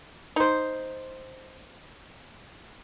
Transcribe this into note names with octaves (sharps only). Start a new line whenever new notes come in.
D#4 C5